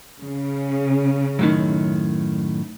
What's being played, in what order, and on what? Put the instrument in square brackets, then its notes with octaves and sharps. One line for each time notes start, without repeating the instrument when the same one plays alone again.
[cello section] C#3
[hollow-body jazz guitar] F#2 A2 D#3